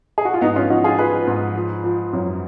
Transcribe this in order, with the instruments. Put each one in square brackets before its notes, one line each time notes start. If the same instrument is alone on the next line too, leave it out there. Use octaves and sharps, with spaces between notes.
[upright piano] G#4
F#4
F4
G#2 B3 D#4
C#4 F4
F3 D#4 F#4
F4 G#4
F3 G#4 B4
G#2
F3
F3
F#2